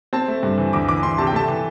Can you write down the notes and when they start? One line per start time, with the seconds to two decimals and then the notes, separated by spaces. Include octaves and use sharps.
0.13 C4 A5
0.28 A3
0.43 G2
0.58 E3
0.73 D2 D6
0.88 E3 D6
1.03 D2 C6
1.18 C3 A5
1.27 G5
1.33 A3 A5
1.48 E3